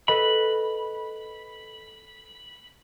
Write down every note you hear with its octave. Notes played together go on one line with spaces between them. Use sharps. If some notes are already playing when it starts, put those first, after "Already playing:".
A4 B4 D#5 B5